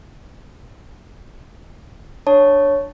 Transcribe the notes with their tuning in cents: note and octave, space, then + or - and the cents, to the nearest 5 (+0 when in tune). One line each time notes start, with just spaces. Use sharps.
D4 +0 C#5 +0 A5 +0